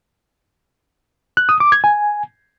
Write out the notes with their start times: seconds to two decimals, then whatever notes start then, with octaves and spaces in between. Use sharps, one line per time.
1.37 F#6
1.49 D#6
1.60 D6
1.72 G#6
1.84 G#5